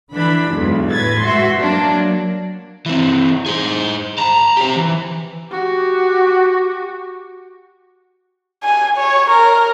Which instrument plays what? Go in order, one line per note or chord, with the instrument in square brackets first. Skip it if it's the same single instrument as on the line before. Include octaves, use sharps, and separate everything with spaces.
[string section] D3 E3 D4 B5
B1 E2 G#2
A2 B4 G#6 A6
G#3 F#4 E5 C6
F#3 A#3 D4
[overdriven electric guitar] E3 C4
G#4 C5
A5 A#5
G4 C5
E3
[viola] F#4 G4
[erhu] G#5
C#5
A#4